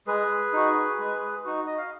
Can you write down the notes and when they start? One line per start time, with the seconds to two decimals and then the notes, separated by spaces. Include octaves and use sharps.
0.07 G#3 G#4 B4
0.53 D#4 F#4
0.99 G#3
1.45 D#4 F#4
1.66 D#5
1.78 F5